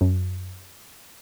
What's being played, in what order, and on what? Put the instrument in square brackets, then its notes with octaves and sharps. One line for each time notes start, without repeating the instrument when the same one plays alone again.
[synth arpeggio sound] F#2